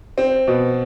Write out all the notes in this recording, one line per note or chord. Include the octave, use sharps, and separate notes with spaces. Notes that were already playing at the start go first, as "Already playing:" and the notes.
C4
B2